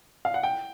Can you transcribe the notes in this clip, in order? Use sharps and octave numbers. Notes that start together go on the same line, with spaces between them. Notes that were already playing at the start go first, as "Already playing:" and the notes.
F5
F#5
G5